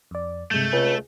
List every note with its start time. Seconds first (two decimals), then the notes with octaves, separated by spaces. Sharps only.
0.11 F2 D5
0.51 G2 C3 G#3 A3 G6
0.73 C#2 G#4